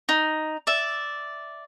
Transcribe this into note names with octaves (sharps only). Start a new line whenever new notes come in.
D#4
D5 E5